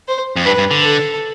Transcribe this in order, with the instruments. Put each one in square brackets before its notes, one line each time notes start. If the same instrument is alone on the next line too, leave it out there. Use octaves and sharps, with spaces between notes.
[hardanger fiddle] C5
[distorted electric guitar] F2
[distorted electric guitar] G2 [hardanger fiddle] B4
[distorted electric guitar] G2
D3
[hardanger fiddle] A4